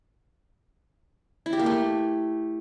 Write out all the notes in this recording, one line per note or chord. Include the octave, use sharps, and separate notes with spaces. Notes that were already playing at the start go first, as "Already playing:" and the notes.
E4
G4
A#3
A3